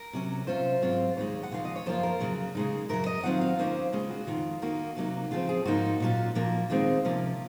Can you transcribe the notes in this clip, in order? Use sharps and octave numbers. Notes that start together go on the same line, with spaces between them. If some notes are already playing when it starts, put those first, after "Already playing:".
Already playing: A#4
C3 F#3 C#4
C3 F#3 C#4 F4 C5
G#2 F#3 C4 F4
D#2 C#3 G#3 C#5
F#5
D#2 C#3 F3 F5
D#5
C#5
F#2 F3 A#3 F4 C5
A#4
F2 C#3 F#3
C#3 G#3 D#4
F#2 C#3 F#3 A#4
D#5
D#3 F#3 C4 F4 F#5
F5
D#2 D#3 A#3 C#4 F4 C5
C#3 G#3 C#4 F4 G#4
F#4
F2 C3 D#3 F4
D#3 A#3 D#4 F#4
C3 F#3 A#3 D#4
C#3 F3 C4 F4
G#4
G#2 F3 A#3 D#4 F#4
A#2 F#3 C#4 F4
A#2 F3 A#3
D#2 D#3 G#3 C4 F4
C3 F3 A#3 C#4